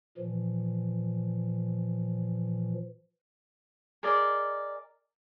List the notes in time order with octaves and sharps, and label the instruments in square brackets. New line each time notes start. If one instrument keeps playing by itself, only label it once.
[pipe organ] A#2 E3 F3
[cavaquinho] G#4 A#4 D5 D#5